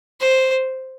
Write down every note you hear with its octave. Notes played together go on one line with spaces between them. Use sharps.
C5